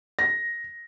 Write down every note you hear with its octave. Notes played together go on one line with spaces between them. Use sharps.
A#6